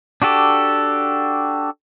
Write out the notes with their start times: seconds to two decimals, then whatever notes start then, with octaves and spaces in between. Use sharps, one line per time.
0.22 D4 F#4 G4 A4